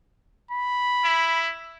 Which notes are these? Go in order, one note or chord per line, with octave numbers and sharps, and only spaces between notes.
B5
E4